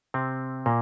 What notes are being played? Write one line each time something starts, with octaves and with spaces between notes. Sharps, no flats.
C3 C4
A#2 A#3